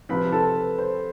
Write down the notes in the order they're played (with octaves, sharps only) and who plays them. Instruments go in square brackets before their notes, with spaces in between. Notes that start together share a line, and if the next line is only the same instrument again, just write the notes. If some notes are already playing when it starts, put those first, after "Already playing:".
[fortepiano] C3 F3 C4 [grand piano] B4 B5
[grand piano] A4 A5
B4
C5